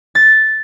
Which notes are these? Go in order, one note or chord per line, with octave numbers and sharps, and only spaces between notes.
A6